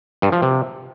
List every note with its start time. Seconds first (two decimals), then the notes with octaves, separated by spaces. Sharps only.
0.22 G2
0.32 F3
0.42 C3